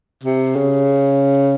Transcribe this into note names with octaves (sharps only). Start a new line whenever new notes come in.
C3
C#3